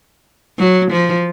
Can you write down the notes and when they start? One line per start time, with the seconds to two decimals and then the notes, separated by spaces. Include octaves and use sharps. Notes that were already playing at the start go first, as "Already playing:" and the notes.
0.59 F#3
0.91 F3